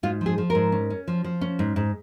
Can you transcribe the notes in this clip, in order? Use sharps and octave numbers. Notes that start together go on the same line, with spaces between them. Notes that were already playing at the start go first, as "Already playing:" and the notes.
G#2 F4
F3
G#4
F3
G#2 A#4
C#4
C#4
F3
F3
C#4
G#2
G#2